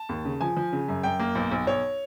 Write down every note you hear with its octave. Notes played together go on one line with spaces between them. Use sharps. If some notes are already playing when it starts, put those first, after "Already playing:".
Already playing: A5
D#2
C#3
F3 G#5
F3
C#3
F#2
F#2 G5
A#3
B1
B1
B1 C#5